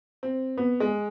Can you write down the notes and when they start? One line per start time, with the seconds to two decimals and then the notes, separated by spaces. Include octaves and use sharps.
0.23 C4
0.57 B3
0.80 G#3